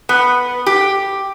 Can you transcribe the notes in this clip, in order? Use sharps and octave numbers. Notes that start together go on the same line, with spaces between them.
B3
G4